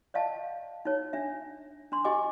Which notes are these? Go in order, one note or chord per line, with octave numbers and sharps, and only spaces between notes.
D5 D#5 F5 A5
D#4 C#5
D4 E5
D4 C6
G4 D#5 G#5 D6